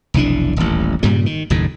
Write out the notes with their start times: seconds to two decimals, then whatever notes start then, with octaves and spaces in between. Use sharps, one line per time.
0.14 F1 B1 E3 D4
0.57 D#1 A1
1.03 G2 A#2 C#3 G3
1.26 D#3
1.50 F#1 D#2 A2